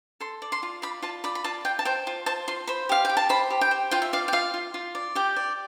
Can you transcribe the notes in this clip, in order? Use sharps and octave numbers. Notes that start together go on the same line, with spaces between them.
A4 C6
D5
C6
F4
D5 B5
F4 A5
D5 B5
B5
F4 A5
F4 G5
A5
C5 G5
F4
C5 A5
F4 C6
C5 B5
G4 F5
G4 G5
A5
C5 B5
G4
G5
C5
F4 G5
E5
D5 F5
G5
F4 F5
F4
F4
D5
G4 G5
D5